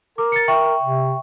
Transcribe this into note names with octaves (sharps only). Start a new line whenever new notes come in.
A#4 D6
A6 C#7
E5 G5 C#6
C3